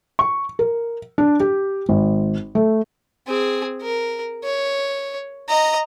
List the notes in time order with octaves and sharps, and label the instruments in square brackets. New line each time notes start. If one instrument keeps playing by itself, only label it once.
[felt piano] C#6
A#4
D4
G4
G#1
A3
[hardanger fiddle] C4 G#4
A#4
C#5
D#5 A#5